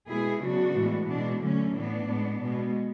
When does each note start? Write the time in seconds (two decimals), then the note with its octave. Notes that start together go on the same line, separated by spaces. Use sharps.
0.09 B2 G#3 B3 E4 G#4
0.42 C#3 F#3 B3 D4 F#4
0.75 A2 E3 G#3 B3
1.08 B2 G#3 B3 D4
1.42 D3 F#3 A3 C#4
1.74 A2 E3 B3 D4
2.07 A2 G#3 B3
2.40 B2 G#3 B3